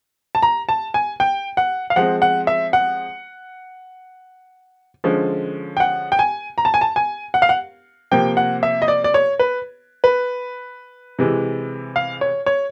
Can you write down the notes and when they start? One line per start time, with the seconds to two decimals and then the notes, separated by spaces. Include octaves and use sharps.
0.35 A5
0.42 A#5
0.69 A5
0.94 G#5
1.20 G5
1.57 F#5
1.90 F5
1.96 F3 G#3 C4 F#5
2.22 F#5
2.47 E5
2.73 F#5
5.04 D3 F3 G#3 C#4
5.77 G5
5.80 F#5
6.12 G5
6.19 G#5
6.58 A#5
6.65 A5
6.74 G#5
6.81 A5
6.96 G#5
7.34 F#5
7.42 F5
7.49 F#5
8.11 C3 F3 A#3 G5
8.37 F#5
8.63 E5
8.82 D#5
8.88 D5
9.04 D5
9.14 C#5
9.39 B4
10.04 B4
11.19 C3 E3 G#3
11.96 F5
12.21 C#5
12.46 C#5